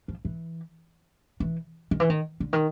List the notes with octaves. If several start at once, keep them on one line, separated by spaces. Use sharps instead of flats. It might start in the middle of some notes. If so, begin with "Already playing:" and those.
F3
E3
E3
D#3
E3
D#3
D3
D#3